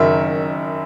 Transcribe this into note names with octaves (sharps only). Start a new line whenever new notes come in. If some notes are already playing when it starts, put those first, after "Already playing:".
Already playing: F#1 F#2 D#3 E5